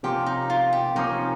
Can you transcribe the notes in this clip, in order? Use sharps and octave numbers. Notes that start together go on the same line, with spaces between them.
C3 F3 A#3 C#4 G4
D#4
F4
G4
C3 F3 A#3 C#4 D#4